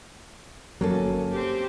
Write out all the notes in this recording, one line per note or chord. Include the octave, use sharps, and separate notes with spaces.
G1 C#2 F#3 A#3 C#4 A4
C4 G4